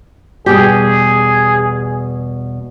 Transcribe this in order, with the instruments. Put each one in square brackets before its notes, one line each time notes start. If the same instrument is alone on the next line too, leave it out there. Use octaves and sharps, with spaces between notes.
[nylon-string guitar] E2 B2 G3 [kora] G4 [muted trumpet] G#4